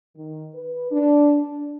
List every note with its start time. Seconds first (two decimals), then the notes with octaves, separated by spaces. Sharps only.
0.16 D#3
0.54 B4
0.91 D4
1.38 D4